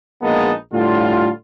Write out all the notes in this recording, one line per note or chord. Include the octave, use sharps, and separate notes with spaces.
A#1 G#3 A#3 B3 D#4 A5
A2 D3 G3 F4